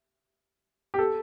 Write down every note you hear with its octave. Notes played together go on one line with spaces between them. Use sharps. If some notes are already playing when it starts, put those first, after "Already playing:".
G4
A4